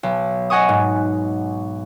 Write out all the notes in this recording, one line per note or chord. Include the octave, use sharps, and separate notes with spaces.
B1
D#5 F#5 G#5 C#6 D#6
G#2